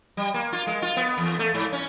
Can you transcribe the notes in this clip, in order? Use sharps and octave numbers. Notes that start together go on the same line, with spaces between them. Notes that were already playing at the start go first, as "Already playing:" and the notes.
G3
A#3
F4
G#3
F4
B3
E2
A3
G#2
C#4